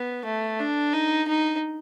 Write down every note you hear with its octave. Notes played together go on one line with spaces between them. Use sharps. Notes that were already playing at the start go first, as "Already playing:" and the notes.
Already playing: B3
A3
D4
D#4
D#4